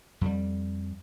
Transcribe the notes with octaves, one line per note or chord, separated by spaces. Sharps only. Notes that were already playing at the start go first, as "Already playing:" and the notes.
F2 G3